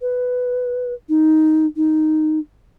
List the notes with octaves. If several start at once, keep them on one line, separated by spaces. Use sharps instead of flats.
B4
D#4
D#4